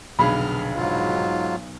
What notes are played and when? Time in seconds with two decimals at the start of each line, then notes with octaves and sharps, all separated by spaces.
0.19 F1 B1 D3 G#4 B5 F6
0.76 G#2 F#3 F4